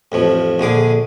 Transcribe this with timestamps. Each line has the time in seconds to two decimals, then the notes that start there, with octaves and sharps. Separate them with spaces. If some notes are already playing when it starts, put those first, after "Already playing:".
0.12 A1 F2 F3
0.60 A#1 D3 G#4 D6